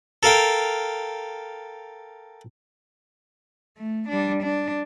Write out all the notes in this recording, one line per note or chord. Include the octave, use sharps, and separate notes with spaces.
A4 A#4 F5 G5
A3
G3 D4
D4